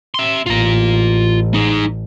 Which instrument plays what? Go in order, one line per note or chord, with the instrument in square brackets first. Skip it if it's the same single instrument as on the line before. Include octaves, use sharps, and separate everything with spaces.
[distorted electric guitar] E5 C6
[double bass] A1 [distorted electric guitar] F4 A#5
[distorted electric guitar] D#4 G#4